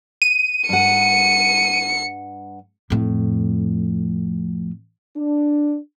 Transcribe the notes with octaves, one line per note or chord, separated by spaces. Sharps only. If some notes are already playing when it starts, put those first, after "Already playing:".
D#7
G2 F#5 C#7
F2 A2
D4